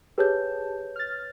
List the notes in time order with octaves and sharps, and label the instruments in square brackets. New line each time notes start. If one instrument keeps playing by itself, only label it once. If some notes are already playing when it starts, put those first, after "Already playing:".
[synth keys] G4 G#4 A5 [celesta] B4 C#5 G6
[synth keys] F6 A6